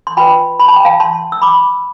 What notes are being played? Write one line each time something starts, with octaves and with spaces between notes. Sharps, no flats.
C6
F4 B4 G5 B5
B5
A5
G5
F5 A5
A5 C6
E6
B5 D6